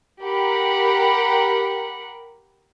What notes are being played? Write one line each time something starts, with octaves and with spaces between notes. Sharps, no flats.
G4 A#4 F#5 B5